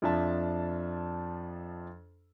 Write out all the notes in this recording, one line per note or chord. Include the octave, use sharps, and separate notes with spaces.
F2 F3 D4 E5 A5